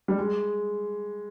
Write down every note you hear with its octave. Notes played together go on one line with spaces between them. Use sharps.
G3
G#3